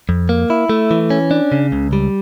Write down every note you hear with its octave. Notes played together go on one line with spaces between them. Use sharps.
F2
A#3
E4
A3
E3
C#4
D4
C#3
C#2
G3